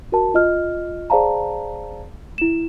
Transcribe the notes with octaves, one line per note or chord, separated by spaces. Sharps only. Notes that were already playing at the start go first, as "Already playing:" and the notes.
F#4 A#4 A5
F4 D#5 F6
G#4 C5 D5 F5 A5 A#5
E4 E7